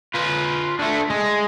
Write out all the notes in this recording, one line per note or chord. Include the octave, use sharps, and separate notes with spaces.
F4 B4
D3 A3
G#3